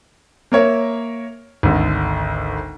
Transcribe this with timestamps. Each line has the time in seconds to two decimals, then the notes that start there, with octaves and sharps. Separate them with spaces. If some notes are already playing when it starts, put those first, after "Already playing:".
0.52 A#3 A#4 C#5 E5
1.63 G#1 D2 D3